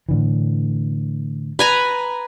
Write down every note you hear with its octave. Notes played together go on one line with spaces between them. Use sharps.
A2 D3 E3
B4 G#5 A#5